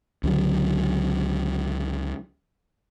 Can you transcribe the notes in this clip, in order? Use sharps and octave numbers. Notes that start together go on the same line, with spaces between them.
C#2 D3 F#3